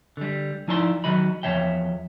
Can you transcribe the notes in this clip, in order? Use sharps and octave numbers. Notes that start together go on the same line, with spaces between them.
D3 G3
F3 D#4 E4 D5 G#5 C6
D#3 F#3 F#4 D#5 B5
E2 B2 F3 C#5 E5 G5